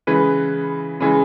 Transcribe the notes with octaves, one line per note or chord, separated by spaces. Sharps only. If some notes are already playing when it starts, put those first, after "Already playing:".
C#3 E3 G#3 B4
C#3 E3 G#3